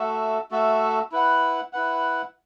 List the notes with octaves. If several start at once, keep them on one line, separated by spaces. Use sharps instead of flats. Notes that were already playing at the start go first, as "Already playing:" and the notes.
Already playing: A3 F#4 A4 E5
A3 F#4 A4 E5
E4 B4 F#5
E4 B4 F#5